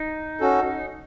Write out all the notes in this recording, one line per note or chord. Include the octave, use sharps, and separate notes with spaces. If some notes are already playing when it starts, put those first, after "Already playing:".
Already playing: D#4
C#4 F#4 A4